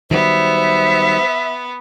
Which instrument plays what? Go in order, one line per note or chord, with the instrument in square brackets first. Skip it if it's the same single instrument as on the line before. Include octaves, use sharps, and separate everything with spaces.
[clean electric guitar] D#3 F#3 G3 [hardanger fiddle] B3 [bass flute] C5 [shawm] E5